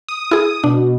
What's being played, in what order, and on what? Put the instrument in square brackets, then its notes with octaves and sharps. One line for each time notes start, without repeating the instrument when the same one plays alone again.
[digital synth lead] D#6
[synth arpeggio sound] E4 G#4
[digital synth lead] B2 [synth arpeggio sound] D4